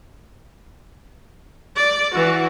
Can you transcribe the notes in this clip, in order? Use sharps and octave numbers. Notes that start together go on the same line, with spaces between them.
D5
E3 F#4